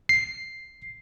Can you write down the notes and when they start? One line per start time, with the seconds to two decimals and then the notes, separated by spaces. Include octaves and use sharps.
0.09 C7